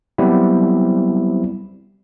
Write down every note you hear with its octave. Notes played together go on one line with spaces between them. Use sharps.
F#3 G3 B3 C4 E4